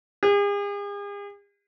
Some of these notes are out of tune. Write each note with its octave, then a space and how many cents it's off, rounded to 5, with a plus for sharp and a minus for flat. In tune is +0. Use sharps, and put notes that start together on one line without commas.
G#4 -45